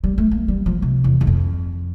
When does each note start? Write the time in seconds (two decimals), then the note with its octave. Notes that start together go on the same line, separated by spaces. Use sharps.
0.04 G3
0.18 A3
0.31 A#3
0.48 G3
0.66 F3
0.82 C3
1.04 E2
1.21 E2
1.27 F2